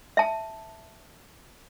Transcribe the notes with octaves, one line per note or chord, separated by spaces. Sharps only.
E5 A5